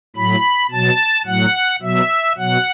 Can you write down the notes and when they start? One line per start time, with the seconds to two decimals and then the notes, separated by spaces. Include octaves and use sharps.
0.16 A2 F#3 B5
0.71 B2 F#3 A5
1.26 A2 F#3 F#5
1.82 B2 F#3 E5
2.37 B2 F#3 F#5